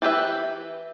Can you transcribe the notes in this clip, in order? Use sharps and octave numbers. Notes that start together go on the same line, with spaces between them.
E3 G4 B4 E5